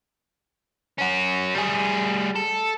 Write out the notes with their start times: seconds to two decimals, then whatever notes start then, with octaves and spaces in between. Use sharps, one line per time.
0.99 C#4 F#4
1.55 G3 G#4
2.36 A4